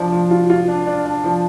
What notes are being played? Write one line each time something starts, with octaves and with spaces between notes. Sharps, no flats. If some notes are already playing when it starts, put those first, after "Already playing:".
Already playing: F3 D4
F3
F4
F4
D4
D4
D4
F3